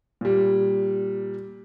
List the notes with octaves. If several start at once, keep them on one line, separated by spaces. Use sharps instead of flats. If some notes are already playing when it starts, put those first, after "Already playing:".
A#2 G3